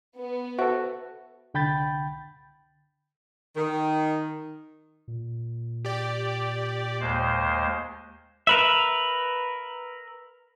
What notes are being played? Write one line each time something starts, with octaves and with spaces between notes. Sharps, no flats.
B3
F#4 A4 C5 E5
C2 D3 G5 B5 G6 A6
D#3
A#2
G4 D5
D#2 G#3 C5
A#4 B4 E5